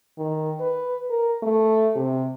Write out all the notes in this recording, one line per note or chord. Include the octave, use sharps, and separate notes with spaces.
D#3
B4
A#4
A3
C3